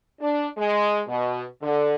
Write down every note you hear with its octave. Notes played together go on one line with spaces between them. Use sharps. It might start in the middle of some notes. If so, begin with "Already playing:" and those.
D4
G#3
B2
D3